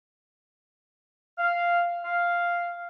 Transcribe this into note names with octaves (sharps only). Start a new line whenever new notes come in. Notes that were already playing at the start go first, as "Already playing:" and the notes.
F5
F5